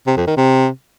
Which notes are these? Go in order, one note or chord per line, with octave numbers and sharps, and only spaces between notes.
C3
F2
D#3
C3